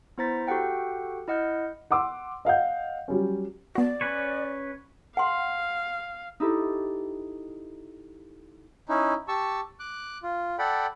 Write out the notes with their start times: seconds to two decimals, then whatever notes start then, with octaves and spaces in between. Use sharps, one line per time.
0.18 B3 E4 C5 A#5 A6 B6
0.47 F#4 G4 A4 F#5 G5
1.28 E4 D#5 F#5 F6 G6
1.91 F#5 C6 D6 E6
2.45 D#5 F5 F#5 G6
3.08 F#3 G3 C#4
3.75 B3 F#4 D5
4.01 C#4 B4 C#5
5.17 F5 F#5 C6
6.40 D#4 E4 G4 A4
8.89 C#4 D#4 E4
9.28 G4 A5 C#6 E6
9.80 D6 F#6
10.23 F4
10.59 A4 D5 F#5 G5 B5